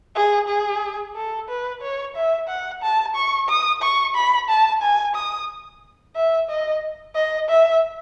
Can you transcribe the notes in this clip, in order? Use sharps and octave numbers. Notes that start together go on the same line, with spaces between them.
G#4
G#4
A4
B4
C#5
E5
F#5
A5
C#6
D#6
C#6
B5
A5
G#5
D#6
E5
D#5
D#5
E5